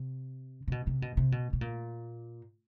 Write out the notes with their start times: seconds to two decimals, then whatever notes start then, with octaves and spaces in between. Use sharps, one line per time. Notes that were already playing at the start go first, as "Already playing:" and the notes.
Already playing: C3
0.68 C3
0.72 B2
0.87 C3
1.02 B2
1.17 C3
1.32 B2
1.53 B2
1.61 A#2